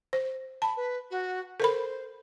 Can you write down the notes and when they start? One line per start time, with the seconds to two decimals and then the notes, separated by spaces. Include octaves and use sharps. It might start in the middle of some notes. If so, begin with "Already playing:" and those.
0.13 C5
0.62 A5 B5
0.76 B4
1.10 F#4
1.60 A4 A#4 C5 B5